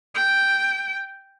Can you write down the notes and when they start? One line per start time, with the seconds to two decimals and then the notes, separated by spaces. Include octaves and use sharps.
0.15 G5